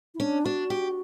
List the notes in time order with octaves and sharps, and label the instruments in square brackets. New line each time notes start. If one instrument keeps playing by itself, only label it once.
[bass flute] E4
[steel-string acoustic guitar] C#4 [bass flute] D4
[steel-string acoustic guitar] D4 [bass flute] F#4
[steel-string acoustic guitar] G4